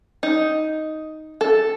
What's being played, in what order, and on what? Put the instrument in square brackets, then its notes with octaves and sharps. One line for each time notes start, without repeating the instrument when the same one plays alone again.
[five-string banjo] D#4
A4